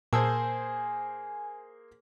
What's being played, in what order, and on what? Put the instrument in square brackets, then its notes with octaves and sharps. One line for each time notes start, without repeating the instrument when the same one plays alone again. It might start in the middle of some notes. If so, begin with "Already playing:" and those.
[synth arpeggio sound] A#2 A5 E6 [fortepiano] A#3 G#4 C5 [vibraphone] G#5